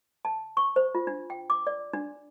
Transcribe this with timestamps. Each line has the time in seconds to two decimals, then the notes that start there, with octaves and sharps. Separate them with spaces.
0.25 A5
0.57 C#6
0.76 C5
0.95 F4
1.07 D4
1.30 G5
1.50 D6
1.67 D5
1.93 D4